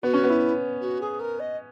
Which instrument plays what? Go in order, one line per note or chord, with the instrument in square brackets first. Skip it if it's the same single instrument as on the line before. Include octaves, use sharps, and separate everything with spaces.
[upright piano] B3 [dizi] F#4
[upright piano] C#4
B3
[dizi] E4
F#4
G#4
A#4
D#5